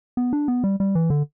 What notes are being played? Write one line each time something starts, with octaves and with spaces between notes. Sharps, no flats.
B3
D4
B3
G3
G3
E3
D3